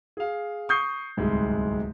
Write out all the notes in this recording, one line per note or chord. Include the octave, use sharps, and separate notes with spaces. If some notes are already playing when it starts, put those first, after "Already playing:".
G#4 F5
C#6 D#6 G6 C7
D1 C2 G#2 G#3